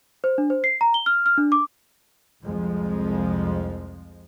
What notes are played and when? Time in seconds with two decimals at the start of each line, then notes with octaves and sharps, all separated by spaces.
0.24 C5
0.38 D4
0.50 C5
0.64 C7
0.81 A#5
0.94 G7
1.06 F6
1.26 F6
1.38 D4
1.52 D6
2.43 C2 F2 F3 G#3